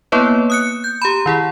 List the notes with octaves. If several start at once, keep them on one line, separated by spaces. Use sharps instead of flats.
A#3 B3 E4 B4 C#5
D#6 F#6 C#7
G6
G4 A#5 B5
D#3 E4 G#4